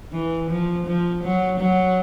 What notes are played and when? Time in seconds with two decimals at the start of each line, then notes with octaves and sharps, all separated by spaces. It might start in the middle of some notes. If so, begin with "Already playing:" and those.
0.13 E3
0.50 F3
0.86 F3
1.24 F#3
1.60 F#3